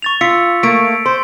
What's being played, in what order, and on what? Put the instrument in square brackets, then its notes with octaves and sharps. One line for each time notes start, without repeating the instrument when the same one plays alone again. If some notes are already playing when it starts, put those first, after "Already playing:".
[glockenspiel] C#6 A6 F7
[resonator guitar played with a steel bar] F4 [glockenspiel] E6 B6 C#7
[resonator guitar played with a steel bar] A3 A#3 [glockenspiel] B6 D7
[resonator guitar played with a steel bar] C5 [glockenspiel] C6